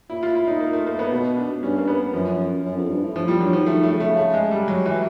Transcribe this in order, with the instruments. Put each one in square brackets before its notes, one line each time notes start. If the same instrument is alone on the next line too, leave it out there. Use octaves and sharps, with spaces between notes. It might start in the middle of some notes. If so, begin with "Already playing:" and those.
[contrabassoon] A#2 [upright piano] E4
[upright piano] F4
E4
D#4
A#3
A3
A#3
B3
[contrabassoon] B2 [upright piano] B3
[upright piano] D4
[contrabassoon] G2 [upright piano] C#4
[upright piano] A#3
B3
A#3
[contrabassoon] F#2 [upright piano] F3
[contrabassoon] F#2
F2
G2
A2
[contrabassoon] A2 [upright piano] F3
[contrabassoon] A#2 [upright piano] G3
[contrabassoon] D3 [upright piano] F#3
[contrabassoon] D#3 [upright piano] F3
[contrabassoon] D#3 [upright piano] A3
[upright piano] A3
[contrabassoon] C#3
[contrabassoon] C3 [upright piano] A3
[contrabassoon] C#3
[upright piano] A3
G#3
G3
F#3
E3